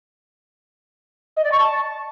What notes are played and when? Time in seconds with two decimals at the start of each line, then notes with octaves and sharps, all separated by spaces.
1.37 D#5
1.44 D5
1.52 C#6
1.60 A5